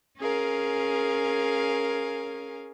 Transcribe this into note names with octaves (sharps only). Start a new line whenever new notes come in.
C#4 G#4 A#4 F5